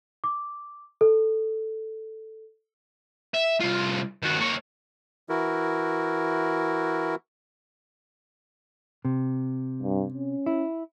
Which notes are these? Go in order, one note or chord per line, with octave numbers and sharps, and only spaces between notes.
D6
A4
E5
C2 F4
D#3 F#4
A#3 C#5
E3 E4 F#4 A#4
C3
G2
C#4
E4